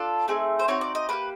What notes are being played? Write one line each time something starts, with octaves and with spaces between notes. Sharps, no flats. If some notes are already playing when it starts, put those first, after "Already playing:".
Already playing: D4 F4 A4
A3 C4 D#4 G#4
C5
C4 D#4 F#4 C#5
D5
D#5
A#3 D#4 G4 B4